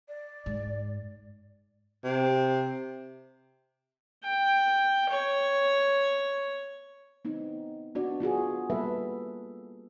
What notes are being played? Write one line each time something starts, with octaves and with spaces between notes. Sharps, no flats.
D5
G#2
C3
G5
C#5
B3 C4 D#4
B3 D4 F#4 D5
B3 F4 F#4 G#4
G3 A#3 B3 A4 B4 E5